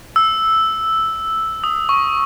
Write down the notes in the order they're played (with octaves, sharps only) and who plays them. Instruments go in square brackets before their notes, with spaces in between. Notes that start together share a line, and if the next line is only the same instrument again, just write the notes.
[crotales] E6
D#6
C#6